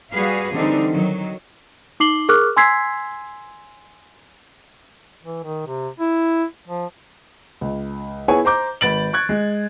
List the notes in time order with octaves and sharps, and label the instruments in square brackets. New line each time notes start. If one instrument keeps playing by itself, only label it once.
[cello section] G3 F#4 G#4 B4 F5
D3 E3 G3 C4 D4 D#4
D#3 F#3
[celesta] D#4 D6 C7 F#7 G7
G#4 A#4 C#6 D6 F6 F#6
G#5 C6 E6 G#6 B6 C7
[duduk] E3
D#3
C3
E4
F3
[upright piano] C#2
B3 E4 G#4 C#5 G#5
C5 A#5 D6 G6
G#1 B4 A6 D7 F#7
C#6 F#6 G#6
G#3